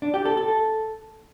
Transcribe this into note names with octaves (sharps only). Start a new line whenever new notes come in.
D4
G4
A4
A4